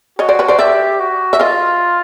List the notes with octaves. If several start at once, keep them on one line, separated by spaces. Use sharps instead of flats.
F#4 C#5 D#5
C5 D5
B4 C#5
C5 D5
G4 D5 E5
F#4
E5
F4 D#5 F5